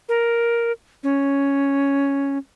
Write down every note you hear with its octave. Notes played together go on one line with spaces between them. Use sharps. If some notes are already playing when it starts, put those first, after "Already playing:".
A#4
C#4